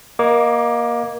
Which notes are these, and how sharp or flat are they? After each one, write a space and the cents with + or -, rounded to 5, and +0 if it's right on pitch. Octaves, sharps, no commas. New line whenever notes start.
A#3 +20 D#5 +0 D6 -15